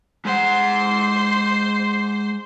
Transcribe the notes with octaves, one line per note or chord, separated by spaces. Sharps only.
G#3 C5 F#5 C6